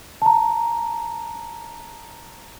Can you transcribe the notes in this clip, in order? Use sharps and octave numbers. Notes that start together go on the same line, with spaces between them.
A5 A#5